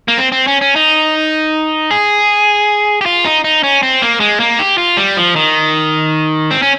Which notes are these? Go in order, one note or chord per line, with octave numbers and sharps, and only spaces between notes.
A#3
C4
C4
C#4
C#4
D#4
G#4
G4
F4
D#4
D#4
C#4
C4
A#3
G#3
A#3
G4
F4
G3
F3
D#3
C4
C#4